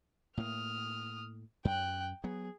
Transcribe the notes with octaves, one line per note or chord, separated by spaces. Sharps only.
A2 A#3 D#6 F6
F#2 G5 F#6
F#3 B3 G#4